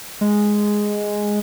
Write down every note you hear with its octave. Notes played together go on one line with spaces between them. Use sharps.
G#3